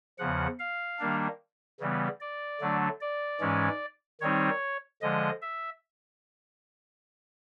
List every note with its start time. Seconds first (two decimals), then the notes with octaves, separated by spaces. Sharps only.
0.19 E2 C#3 F3 F#5
0.59 F5
0.99 D#3 G3 A#3 D4
1.80 C#3 E3 G3 B3
2.21 D5
2.60 D3 F#3 A3 D4
3.01 D5
3.41 G#2 E3 G#3 C#4
4.21 D#3 G3 C4 D#4 C#5
5.02 D3 F3 G#3 D#5
5.42 E5